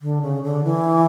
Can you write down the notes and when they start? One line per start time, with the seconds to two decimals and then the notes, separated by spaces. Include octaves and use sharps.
0.02 D3
0.22 C#3
0.43 D3
0.64 E3